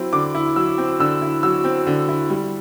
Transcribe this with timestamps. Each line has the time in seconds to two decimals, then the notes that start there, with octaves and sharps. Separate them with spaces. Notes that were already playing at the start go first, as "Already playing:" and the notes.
Already playing: F#3 C4 E4
0.13 D3 D6
0.35 E4
0.56 F#3 E6
0.78 C4
1.00 D3 E6
1.22 E4
1.43 F#3 E6
1.64 C4
1.87 D3
2.09 E4
2.30 G3